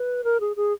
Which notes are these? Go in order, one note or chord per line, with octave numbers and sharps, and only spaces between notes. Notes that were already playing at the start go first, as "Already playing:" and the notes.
Already playing: B4
A#4
G#4
G#4